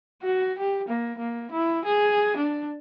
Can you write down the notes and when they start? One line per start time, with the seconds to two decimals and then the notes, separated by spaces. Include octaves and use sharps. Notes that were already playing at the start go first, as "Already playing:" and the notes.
0.23 F#4
0.59 G4
0.88 A#3
1.18 A#3
1.51 E4
1.85 G#4
2.37 D4